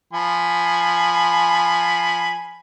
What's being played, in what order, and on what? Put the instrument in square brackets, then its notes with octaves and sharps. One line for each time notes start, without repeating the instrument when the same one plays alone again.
[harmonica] F3 G#5 B5